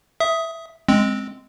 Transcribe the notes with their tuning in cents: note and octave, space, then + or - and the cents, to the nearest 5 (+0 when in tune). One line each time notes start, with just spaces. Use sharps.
E5 +0 D#6 +15
G#3 +0 C4 +0